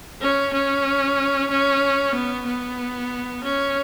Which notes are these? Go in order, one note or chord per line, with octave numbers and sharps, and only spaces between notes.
C#4
C#4
C#4
B3
B3
C#4